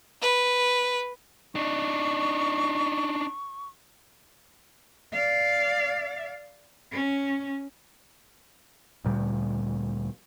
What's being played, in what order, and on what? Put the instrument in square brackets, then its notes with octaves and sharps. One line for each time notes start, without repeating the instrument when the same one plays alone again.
[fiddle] B4
[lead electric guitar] D4 D#4 [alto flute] C#6
[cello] D5 F5
C#4
[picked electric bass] D2 A#2 G3